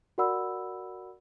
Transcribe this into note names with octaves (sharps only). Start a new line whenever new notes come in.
F#4 A#4 D5 F#5 B5 E6